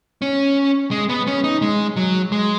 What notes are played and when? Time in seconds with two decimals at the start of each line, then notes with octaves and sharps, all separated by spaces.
0.22 C#4
0.91 G#3
1.09 B3
1.27 C#4
1.44 D#4
1.62 G#3
1.96 F#3
2.32 G#3